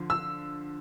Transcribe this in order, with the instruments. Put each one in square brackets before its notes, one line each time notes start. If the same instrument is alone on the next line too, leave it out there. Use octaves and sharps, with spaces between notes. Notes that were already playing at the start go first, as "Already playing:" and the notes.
Already playing: [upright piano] D3 F3
E6